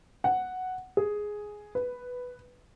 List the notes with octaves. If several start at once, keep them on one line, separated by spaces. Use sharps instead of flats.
F#5
G#4
B4